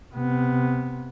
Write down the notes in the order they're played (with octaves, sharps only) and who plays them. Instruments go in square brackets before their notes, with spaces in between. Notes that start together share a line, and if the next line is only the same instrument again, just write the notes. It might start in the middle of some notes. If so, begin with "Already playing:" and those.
[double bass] C3 B3